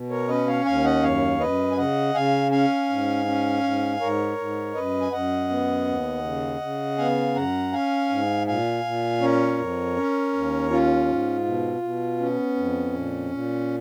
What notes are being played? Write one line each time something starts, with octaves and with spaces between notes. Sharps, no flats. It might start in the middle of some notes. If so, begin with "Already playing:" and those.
Already playing: B2
A#4 C#5
C#4 B4 D#5
C#5 F5
D#2 F5 G#5
D#5 F#5
F#2 C#5 F5
F#2 B4 D#5
G#5
C#3 D#5 F#5
C#3 F5 G#5
C#4 F5 G#5
G#2
C#4
G#2
G#2 A#4 C#5
G#2
F#2 B4 D#5
G#5
F#2 D#5 F#5
B3
D#2
C#3
C#3
B3 F5 G#5
F#2 F#5 A#5
C#4 F5 G#5
G#2
A#2 F5 G#5
A#2
C#4 A#4 C#5
F2
C#4
D#2
C#4 F4
G#2
B2
B2
B3 C#4
F2
A#2
A#2